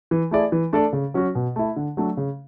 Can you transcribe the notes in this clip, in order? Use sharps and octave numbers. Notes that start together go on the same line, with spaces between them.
E3
A3 E4 G#4 D5
E3
A3 D4 A4 D5
C#3
F#3 C#4 F#4
B2
A3 E4
D3
F#3 A3 D4
C#3